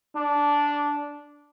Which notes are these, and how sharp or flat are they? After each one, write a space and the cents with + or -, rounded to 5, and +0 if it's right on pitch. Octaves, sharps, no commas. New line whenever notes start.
D4 -10